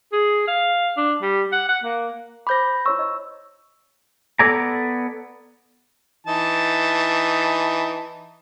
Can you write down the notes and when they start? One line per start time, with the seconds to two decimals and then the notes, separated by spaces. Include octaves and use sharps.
0.13 G#4
0.48 F5
0.97 D4
1.22 G3
1.52 F#5
1.68 F#5
1.84 A#3
2.47 C5 B5 D6 G6 A#6
2.86 E4 C#5 C#6 E6
2.99 D#5
4.39 B3 A4 D5 G#5 A#5
6.27 E3 D#4 A5